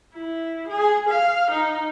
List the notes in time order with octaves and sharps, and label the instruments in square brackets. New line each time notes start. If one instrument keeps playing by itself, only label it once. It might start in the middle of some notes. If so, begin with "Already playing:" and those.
[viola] E4
G#4
F5
D#4